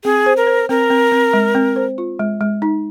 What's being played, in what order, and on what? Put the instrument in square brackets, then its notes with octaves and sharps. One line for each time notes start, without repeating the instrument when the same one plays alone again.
[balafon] C4 [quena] G#4
[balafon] C5
[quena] A#4
[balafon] C5
[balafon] C4 [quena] A#4
[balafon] C4
C4
G#3
C4
C5
F4
G#3
G#3
D#4